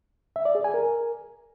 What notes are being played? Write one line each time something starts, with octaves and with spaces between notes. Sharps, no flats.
E5
D5
G#4
G#5
A#4